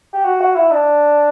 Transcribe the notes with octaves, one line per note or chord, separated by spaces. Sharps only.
G4
F#4
F#4
E4
D4